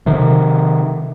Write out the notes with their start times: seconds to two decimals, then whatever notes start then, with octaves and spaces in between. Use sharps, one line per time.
0.06 C3 D#3